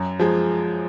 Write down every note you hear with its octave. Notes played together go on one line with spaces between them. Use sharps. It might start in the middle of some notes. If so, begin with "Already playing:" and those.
Already playing: F#2 A#5
F3 G#3